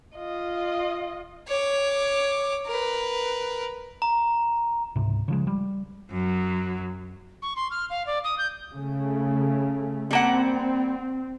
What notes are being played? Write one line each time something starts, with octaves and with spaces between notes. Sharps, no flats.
F4 D#5
C#5 D6
A#4 B4
A#5
C#2 G#2 C3
C#3 F3 G#3
G3
F#2 F#3
C#6
C6
F6
F5
D5
D#6
G6
C#3 A3
G3 A#3 C4 F#5